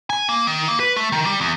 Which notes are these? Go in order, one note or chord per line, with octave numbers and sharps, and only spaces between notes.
G#5
A#3
D#3
A#3
B4
A3
D#3
G3
E2